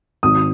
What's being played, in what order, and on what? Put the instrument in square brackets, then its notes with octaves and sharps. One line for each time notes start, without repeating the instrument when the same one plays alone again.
[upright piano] G#1 D#6